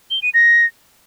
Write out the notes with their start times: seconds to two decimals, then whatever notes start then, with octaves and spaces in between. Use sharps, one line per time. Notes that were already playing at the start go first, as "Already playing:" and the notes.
0.10 G7
0.22 D#7
0.34 A#6